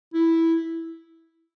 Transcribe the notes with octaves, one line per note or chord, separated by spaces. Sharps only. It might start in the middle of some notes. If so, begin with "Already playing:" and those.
E4